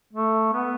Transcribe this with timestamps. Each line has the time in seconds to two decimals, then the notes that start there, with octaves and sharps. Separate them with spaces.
0.13 A3
0.53 B3